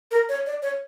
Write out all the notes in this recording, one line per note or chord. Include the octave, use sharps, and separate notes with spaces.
A#4
C#5
D5
C#5